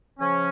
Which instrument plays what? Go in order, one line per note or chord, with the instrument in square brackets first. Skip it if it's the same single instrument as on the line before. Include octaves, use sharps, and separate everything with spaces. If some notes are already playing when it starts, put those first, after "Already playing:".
[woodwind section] C#3 F3 C#4